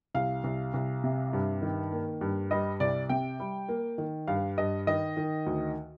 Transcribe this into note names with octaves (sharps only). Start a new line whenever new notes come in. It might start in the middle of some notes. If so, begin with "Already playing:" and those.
C2 F5
C2
C2
C3
G2
D#3
A#3
G2
G3 D#5
C2 D5
C3 G5
G3
A#3
D#3
G2 F5
G2 D#5
D#3 D#5
D#3
D2